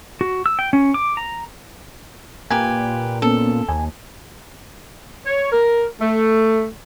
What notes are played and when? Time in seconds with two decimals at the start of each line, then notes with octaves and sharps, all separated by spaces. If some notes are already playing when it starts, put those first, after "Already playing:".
0.21 F#4
0.46 E6
0.59 G5
0.73 C#4
0.94 D6
1.17 A#5
2.50 A#2 G4 B4 G#5
3.22 A#3 B3 C#4 A4
3.69 D#2 G#5
5.26 C#5
5.50 A#4
6.00 A3